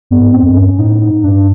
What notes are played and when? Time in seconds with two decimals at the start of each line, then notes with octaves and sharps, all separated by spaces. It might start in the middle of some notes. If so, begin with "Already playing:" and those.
0.11 G2 B3
0.19 G#2
0.33 C4
0.43 F#2
0.49 G2
0.57 C#4
0.78 A2 D#4
1.02 D#4
1.23 G2 D4